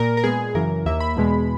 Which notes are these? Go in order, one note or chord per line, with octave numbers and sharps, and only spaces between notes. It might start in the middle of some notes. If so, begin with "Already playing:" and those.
Already playing: A#2 A#4
A#4
A#2 G#3 B3 G#4
F#2 C#3 E3 A#4
D#2 D#3 A#3 E5
B5
E2 B2 G#3